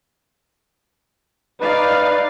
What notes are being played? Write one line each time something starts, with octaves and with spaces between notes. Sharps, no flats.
D#4 B4 D5 F5